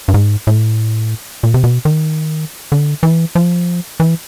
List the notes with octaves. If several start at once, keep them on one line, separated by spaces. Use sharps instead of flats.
G2
G#2
A2
A#2
C3
B2
D#3
D3
E3
F3
E3